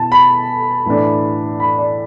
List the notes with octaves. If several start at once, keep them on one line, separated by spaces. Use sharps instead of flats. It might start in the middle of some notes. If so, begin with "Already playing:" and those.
Already playing: B2 B3 E4 A5
B5
A2 E3 A3 D4
B5
D5